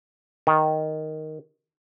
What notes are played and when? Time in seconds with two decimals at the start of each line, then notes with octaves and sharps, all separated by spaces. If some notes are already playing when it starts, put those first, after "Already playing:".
0.47 D#3